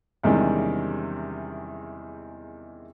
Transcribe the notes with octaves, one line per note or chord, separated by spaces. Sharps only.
E2 C3 D#3 G3 G#3 C#4